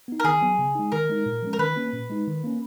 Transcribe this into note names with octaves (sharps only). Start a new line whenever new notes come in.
B3 D#4
A#4
D#3 G#4
F#3 B3
C#3
G#3 D#4
D#3 A#4
G#3 D#4
A#2
F3 G#3 C#4
A#4
D#3 B4
A#3 C#4
A#2
G#3 D#4
D#3
A#3 C#4